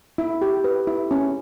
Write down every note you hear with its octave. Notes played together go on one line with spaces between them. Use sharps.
E4
G4
B4
E4
C#4